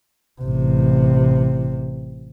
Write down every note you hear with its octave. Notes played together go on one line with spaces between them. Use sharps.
A1 C3